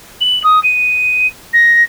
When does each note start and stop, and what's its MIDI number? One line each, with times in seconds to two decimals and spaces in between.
0.21 0.42 102
0.44 0.62 87
0.63 1.27 99
1.53 1.83 94